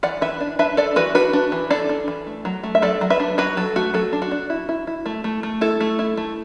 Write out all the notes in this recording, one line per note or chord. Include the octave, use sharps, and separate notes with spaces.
E3 D5 F#5
E3 B4 E5
D4
D4 B4 E5
D4 A4 D5
E3 F#4 B4
D4 F#4 B4
D4
E3
D4 A4 D5
D4
E3
A3
F#3
A3
E5
F#3 A4 D5
F#3
B4 E5
D4
F#3 F#4 B4
F#3 A4
A3 F#4
F#3 A4
D4
F#4
D4
E4
E4
E4
A3
A3
A3
E4 A4
A3
E4
A3